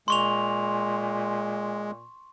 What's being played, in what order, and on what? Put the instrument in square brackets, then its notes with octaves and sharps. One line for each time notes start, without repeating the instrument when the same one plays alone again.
[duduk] A#2 [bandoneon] G#3 [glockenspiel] C6 C#6 F7